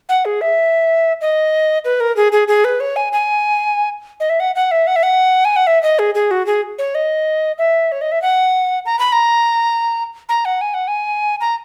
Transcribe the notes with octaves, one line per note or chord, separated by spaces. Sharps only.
F#5
G#4
E5
D#5
B4
A#4
G#4
G#4
G#4
B4
C#5
G#5
G#5
D#5
E5
F#5
F#5
E5
F#5
E5
F#5
G#5
F#5
E5
D#5
G#4
G#4
F#4
G#4
C#5
D#5
E5
C#5
D#5
E5
F#5
A#5
B5
A#5
A#5
F#5
G#5
F#5
G#5
A#5